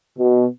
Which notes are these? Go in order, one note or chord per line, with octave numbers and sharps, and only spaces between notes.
B2